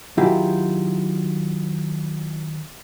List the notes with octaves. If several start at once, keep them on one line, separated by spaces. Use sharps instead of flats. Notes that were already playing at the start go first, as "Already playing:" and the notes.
D#3 F#3 E4 F4 G4 G#4